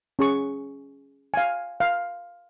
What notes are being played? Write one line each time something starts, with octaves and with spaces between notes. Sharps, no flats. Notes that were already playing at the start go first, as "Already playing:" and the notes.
C#4 G#4 C#6
F5 G#5
F5